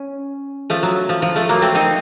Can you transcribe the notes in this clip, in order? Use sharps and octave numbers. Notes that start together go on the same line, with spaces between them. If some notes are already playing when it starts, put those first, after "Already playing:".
Already playing: C#4
F3 A3
F#3
F3
F3
F3 A3
F#3 A#3
A3 C4
C4 D#4